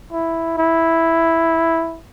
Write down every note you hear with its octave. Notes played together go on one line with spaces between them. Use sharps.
E4
E4